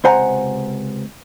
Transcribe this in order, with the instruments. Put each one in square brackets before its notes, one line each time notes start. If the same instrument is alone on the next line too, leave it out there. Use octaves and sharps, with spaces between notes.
[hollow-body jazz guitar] C#2 C3 C5 F#5 G#5 A#5